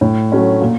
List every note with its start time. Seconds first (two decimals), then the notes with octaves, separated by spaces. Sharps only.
0.01 A2
0.32 F#3 A3 C#4
0.62 A#2